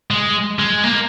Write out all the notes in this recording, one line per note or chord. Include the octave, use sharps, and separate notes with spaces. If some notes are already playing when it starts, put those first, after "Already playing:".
G#3
G#3
A#3